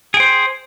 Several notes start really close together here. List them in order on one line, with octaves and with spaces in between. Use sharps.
G#4 G5 C5